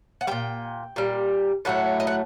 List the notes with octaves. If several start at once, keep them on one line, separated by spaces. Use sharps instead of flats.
F#5
A#2 G3 G5
A#2 G3
A2 F#3 A3 F#5
D#5
F#5